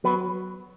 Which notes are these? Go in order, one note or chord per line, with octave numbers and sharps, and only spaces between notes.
F#3 B3 B4